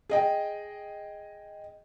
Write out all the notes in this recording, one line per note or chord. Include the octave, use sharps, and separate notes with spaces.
G#4 D#5 G5